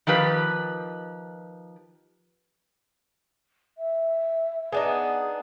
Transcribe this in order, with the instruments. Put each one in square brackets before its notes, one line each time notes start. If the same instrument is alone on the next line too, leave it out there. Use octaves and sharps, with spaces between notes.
[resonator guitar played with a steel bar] D#3 F3 G4 B4
[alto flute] E5
[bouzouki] B3 D4 D#4 [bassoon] G#4